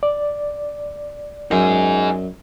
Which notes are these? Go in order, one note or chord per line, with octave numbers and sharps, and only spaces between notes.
D5
F#2 D#4 G#4